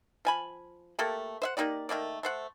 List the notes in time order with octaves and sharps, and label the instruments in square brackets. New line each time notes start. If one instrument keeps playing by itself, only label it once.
[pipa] F3 G#5 B5
A3 A#3 G4 A4
C5 E5 F#5
A#3 D#4 G4 D5
D#3 A3 A#3 D5
A3 C5 F#5